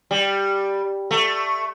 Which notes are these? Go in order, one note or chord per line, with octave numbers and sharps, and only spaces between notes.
G3
A3